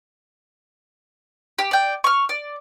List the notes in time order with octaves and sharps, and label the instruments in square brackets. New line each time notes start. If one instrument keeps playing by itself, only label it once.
[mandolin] G4
D5 G5
C#6 F6
D5